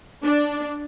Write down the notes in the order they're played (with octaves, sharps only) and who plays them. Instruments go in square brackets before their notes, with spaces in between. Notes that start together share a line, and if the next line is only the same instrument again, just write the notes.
[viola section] D4